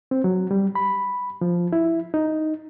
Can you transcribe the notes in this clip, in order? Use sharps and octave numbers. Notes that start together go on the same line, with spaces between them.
C4
F#3
G3
B5
F3
E4
D#4